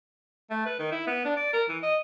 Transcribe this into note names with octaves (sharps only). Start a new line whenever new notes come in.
A3
B4
D#3
E4
B3
D4
D5
A#4
E3
D#5